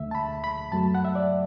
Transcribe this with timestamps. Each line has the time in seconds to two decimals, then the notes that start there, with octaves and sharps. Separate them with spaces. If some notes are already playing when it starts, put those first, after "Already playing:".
Already playing: D2 D3 A3 E5
0.11 A5
0.15 B5
0.44 B5
0.72 F#2 F#3 A3 A5
0.95 F#5
1.05 E5
1.15 D5